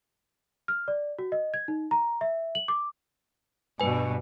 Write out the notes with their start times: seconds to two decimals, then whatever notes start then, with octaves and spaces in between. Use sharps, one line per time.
0.68 F6
0.88 D5
1.19 F#4
1.32 D#5
1.54 G#6
1.68 D#4
1.91 A#5
2.21 E5
2.55 F#7
2.68 D6
3.80 G2 B2 B4 G#5